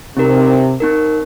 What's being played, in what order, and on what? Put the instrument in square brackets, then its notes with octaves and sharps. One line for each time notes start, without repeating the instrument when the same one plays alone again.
[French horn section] C3 [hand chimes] C4 D#4 A#4
[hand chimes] C4 D#4 A#4